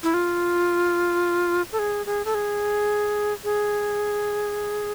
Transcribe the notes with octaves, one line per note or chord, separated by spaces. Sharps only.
E4
F4
A4
G#4
G#4
A4
G#4
G#4